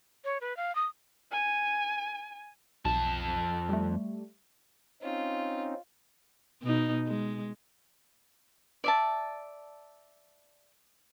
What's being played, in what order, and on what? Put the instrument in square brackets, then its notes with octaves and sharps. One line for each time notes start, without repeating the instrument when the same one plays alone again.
[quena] C#5
B4
F5
D#6
[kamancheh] G#5
[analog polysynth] B1 [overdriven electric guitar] F2 A5
[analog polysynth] G3 A3
[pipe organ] C4 C#4 D#4 [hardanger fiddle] F4
[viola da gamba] B2 D#4
G#3
[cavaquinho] D5 E5 A5